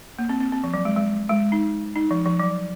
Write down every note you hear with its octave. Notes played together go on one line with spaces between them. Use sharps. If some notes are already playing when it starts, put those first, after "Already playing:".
A#3
C4
C4
C4
F3
F#3
G#3
G#3
G#3
D#4
D#4
F3
F3
F#3